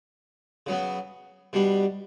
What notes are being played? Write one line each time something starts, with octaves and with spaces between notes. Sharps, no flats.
C#3 F#3 B3
B2 G3 D4